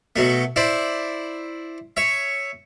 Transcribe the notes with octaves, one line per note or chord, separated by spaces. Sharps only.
B2 F#3 A3
E4 C5 D5
C#5 E5